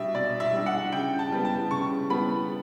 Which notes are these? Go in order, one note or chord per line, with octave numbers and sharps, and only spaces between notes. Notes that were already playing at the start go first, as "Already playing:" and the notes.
Already playing: B2 G3 D4 E5
B2 D5
E5
G3 D4
F#5
C#3 G5
A5
G3 B3
A5
C#3 C#6
G3 B3 B5